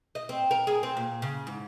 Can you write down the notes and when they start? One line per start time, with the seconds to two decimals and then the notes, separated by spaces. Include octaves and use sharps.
0.15 D#5
0.29 C4
0.51 A#4
0.67 G#4
0.83 C4
0.97 A#2
1.22 C#3
1.47 G#2